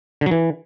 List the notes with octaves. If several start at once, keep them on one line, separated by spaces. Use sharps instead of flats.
D3
F#3
E3